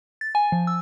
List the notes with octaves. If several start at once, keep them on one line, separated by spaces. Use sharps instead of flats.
A6
G#5
F3
E6